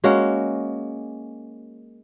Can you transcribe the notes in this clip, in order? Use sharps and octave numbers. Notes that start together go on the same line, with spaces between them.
G#3 A#3 C#4 F#4